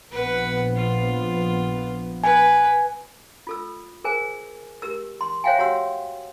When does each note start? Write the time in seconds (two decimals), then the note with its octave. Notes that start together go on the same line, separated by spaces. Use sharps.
0.11 A#1 F3 B3 B4 F#5
0.76 F4
2.24 B4 G#5
3.47 F4 A4 E6
4.04 G#4 A#4 C5 G#5
4.82 G4 A#4 E6
5.21 C6
5.44 C5 C#5 E5 F5 G5 G#5
5.59 F#4 G4 C#5 F#5 C6 E6